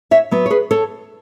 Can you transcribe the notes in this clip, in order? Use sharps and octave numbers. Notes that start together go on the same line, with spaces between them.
C#5 E5
F#3 B3
C#5
G#4 B4
A4 C#5